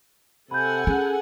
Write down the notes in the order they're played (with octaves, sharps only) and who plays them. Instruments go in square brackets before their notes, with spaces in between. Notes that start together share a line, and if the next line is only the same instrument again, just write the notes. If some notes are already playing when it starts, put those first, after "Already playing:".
[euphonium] C3 [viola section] A4 F#5 G#5 [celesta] B5 G6
[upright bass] C#4 [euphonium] G#4